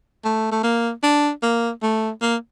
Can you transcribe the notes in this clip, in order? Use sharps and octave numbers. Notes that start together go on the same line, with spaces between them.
A3
A3
A#3
D4
A#3
A3
A#3